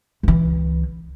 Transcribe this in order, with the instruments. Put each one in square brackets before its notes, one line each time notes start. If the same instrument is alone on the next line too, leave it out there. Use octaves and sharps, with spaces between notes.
[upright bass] C#2 E3